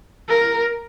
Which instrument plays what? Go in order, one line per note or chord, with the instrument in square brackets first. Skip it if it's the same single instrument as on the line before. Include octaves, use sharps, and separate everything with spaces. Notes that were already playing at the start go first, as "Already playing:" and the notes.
[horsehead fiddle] A#4